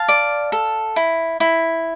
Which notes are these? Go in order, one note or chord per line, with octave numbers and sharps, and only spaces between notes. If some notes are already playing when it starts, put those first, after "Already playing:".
Already playing: F5 A5
D5
A4
E4
E4